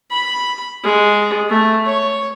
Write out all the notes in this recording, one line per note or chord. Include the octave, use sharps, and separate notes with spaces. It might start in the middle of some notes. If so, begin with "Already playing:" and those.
B5
G#3
A3
C#5